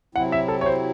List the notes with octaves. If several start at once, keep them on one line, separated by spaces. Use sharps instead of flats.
C3 F#3 C4 E4 F#5
E5
A4
C#5
C5